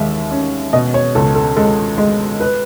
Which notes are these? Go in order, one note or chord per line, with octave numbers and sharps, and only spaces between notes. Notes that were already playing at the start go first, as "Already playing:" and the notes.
Already playing: D#2 G#3 E5
C#4
B2 D#5
C#5
C#2 A4
A4
G#3 A4
G#3
B4